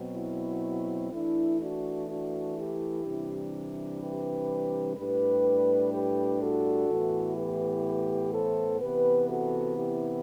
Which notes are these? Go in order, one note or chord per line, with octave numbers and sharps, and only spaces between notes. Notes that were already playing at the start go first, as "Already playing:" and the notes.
Already playing: B2 F#3 C4
E4
E3 A3 D4 E4
D4 F#4
D4 F#4
E4 G4
C3 E3 G3 D4
G4 B4
A2 G3 D4 G4 B4
G4 B4
F#4 A4
A2 E3 B3
G4 B4
A4 C5
C3 E3 B3 G4 B4
F#4 A4
E4 G4